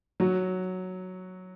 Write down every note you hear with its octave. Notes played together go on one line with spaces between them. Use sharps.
F#3 F#4